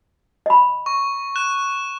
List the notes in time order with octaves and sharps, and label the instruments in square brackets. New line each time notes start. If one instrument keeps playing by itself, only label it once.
[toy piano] D#5 B5
[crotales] C#6
F#6 E7